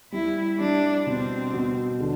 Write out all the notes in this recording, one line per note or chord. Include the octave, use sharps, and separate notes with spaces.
G3 E4
G3 D4
B2 C4
B2
D3